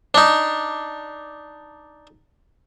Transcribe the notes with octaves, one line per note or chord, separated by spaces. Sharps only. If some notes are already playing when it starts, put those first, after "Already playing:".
D4 D#4